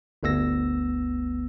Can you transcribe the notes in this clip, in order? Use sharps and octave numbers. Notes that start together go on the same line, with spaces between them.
G1 D2 B3 E6 A#6